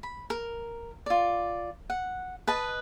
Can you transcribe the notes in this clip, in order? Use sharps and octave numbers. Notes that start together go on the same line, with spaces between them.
B5
A#4
F4 D5
F#5
B4 D#5 A5